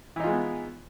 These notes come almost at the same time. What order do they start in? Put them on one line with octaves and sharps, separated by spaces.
E3 D#4 F4 G#3 B3